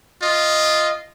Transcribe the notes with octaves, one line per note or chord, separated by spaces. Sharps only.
F4 D#5